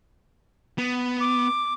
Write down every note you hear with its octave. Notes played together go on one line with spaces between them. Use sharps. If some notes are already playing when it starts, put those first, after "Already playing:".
B3
D6